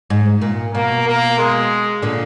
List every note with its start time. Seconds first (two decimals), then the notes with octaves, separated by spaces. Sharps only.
0.10 G#2
0.41 A#2
0.74 B2 A#3
1.07 A#3
1.39 G#3
2.02 A#2 D3